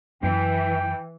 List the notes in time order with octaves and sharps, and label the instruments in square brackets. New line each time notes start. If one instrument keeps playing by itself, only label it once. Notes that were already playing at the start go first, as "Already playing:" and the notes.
[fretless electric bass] F#2 [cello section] E3 [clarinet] G5